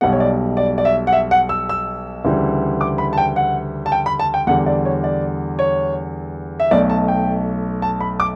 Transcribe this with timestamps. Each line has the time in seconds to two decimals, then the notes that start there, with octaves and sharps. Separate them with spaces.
0.01 B1 B2 G3 F#5
0.13 C#5
0.20 D5
0.57 D5
0.78 D5
0.85 E5
1.07 F#5
1.13 E5
1.31 F#5
1.49 E6
1.69 E6
2.25 D2 C#3 E3 G3
2.81 D6
2.98 B5
3.13 A5
3.18 G5
3.36 F#5
3.86 A5
3.92 G5
4.06 B5
4.20 A5
4.34 G5
4.47 E2 D3 G3 F#5
4.66 D5
4.85 C#5
5.04 D5
5.59 C#5
6.60 E5
6.71 B1 B2 A3 D5
6.90 A5
7.08 G5
7.82 A5
8.01 B5
8.20 D6